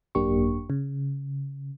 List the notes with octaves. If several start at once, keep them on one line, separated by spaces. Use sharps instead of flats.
G#1 F#2 A#3 D4 G4 C#6
C#3